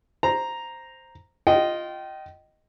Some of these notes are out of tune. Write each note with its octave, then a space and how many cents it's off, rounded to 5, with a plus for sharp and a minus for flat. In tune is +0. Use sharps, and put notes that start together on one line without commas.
C5 +0 A#5 +0
F4 +0 D#5 +0 G5 -30